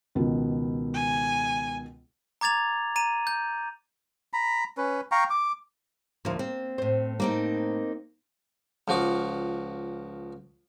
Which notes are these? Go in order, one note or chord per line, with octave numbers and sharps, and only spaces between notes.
C#2 B2 D#3
G#5
A#5 D6 G#6 A6 F7
A#5 D#7
G6
A#5 B5
C#4 B4
F5 G5 A#5 C#6
D6
D2 F3 A#3
C4
A2 C5
A#3 C4 D#4
C#2 F3 F#4 D6